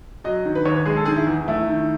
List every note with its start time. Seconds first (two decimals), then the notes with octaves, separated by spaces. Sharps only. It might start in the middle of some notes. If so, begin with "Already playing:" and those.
0.24 F#3 D#5
0.45 D#3
0.55 B4
0.65 D#2 C#5
0.75 B4
0.86 G#3 G#4
0.97 A4
1.05 D#3 G#4
1.17 E4
1.27 E2
1.48 A3 E4
1.68 D#3